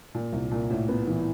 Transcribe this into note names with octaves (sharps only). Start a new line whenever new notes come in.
A#2
C2
A#2
A2
B3
E3